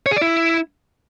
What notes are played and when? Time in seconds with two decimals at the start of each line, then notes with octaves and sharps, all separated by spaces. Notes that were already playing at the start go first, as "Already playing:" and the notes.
0.06 C#5
0.11 G#4
0.16 D5
0.21 E4